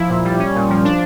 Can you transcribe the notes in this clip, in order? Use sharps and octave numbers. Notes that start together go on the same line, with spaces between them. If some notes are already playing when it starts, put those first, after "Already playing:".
Already playing: F3 E4
A#2
G3
C#4
A#2
F3
D4